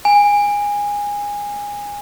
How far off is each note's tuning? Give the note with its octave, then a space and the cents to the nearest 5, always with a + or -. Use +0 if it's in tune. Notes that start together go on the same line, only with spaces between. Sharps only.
G#5 -20